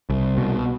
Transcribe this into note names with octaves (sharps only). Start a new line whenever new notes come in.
C2
B2